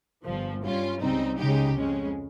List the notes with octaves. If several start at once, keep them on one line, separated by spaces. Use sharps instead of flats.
G1 G2 F3
G2 G3 C#4 F4
C#2 C#3 G3 C4 D#4
C#2 C#3 G#3 D#4 G4
F2 C#3 G#3 C#4